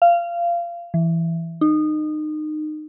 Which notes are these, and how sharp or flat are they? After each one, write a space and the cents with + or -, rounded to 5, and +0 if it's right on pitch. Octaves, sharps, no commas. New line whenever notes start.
F5 -20
E3 +10
D#4 -25